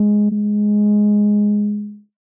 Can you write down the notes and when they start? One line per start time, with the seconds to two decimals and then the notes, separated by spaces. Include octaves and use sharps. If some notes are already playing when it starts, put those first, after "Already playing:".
Already playing: G#3
0.32 G#3